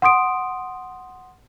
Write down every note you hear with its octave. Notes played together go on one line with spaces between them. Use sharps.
F#5 C6 D#6 D7